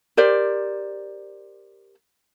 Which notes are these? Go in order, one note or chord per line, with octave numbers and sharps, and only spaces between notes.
G4 A#4 C5 D5